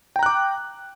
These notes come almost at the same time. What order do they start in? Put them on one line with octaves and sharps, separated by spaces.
G5 A#5 F#6 D6